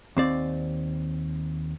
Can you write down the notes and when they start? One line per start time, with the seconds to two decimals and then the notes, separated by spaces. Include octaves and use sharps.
0.17 D#2 C4 D5